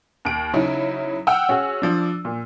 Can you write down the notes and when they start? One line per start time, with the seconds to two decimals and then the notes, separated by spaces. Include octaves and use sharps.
0.25 D#2 D7
0.53 C#3 F#3 D#4 E4
1.27 F#5 G5 E6 F6
1.49 C#4 F#4 G#4
1.82 F3 D4
2.25 A#2